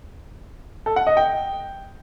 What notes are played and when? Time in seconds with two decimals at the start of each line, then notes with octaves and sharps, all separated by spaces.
0.86 A4
0.96 F#5
1.07 D#5
1.17 G5